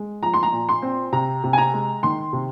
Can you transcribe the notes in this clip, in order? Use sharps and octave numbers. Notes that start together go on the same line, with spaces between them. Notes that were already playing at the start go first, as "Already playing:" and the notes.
Already playing: G#3
F3 A#5
C6
A#5
A#2
C6
C4
C3 A#5
C3
G#5
A#5
G#3
D#3 C6
C3